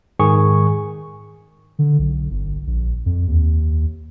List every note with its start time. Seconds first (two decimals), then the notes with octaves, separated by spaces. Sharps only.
0.19 G#2 D#3 G#4 C#6
1.79 D3
1.99 B1
2.31 G1
2.67 A#1
3.06 F2
3.28 D#2